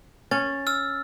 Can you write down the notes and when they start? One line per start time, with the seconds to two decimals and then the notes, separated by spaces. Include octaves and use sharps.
0.31 C#4 A6
0.67 E6 F6